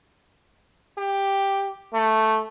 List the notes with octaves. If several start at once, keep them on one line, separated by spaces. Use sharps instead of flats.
G4
A3